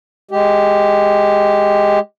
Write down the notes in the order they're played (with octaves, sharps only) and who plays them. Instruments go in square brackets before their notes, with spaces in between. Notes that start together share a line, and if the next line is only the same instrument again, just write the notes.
[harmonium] G#3 G4